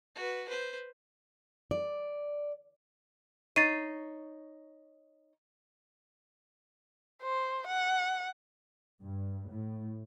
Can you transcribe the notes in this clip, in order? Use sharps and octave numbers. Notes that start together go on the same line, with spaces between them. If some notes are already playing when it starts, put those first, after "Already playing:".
F#4 B4
B4 C5
D5
D#4 C#5 A6 C7 D#7
C5
F#5
G2
A2